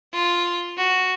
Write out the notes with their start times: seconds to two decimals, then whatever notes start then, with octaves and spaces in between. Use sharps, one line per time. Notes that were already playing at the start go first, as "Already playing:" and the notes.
0.13 F4
0.77 F#4